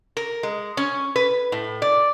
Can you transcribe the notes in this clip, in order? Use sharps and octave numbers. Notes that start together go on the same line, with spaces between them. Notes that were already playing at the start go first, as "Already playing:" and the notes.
A#4
G#3
C#4
B4
A2
D5